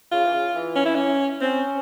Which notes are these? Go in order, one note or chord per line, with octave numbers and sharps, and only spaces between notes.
C#3 F4
E3
C#3
E3
C#4
E4
C#4
C4 C#4